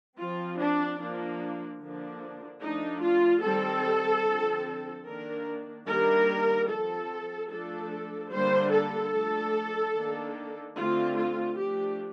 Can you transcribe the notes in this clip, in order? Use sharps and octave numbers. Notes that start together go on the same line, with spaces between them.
F3 C4 F4
D4
F3 A#3 D4
D3 F3 A#3 D4
F3 A3 D4 D#4
F4
D#3 G3 C4 A4
D3 F3 C4
D#3 A#3 D4 A#4
D#3 G3 A#3 D4 A#4
F3 C4 A4
F3 A3 D4 A4
D3 G3 A#3 D4 C5
A4
F3 A3 D4
D#3 A#3 D4
D3 A3 C4 F4
F4
F3 A3 D4 G4